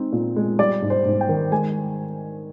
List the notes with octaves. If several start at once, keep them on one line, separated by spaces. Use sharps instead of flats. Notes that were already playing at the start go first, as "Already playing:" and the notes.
Already playing: G#3 C4 D#4
A#2
G#3
G3 D5
G#2
C5
G#2
G5
D#3
G#3 G#5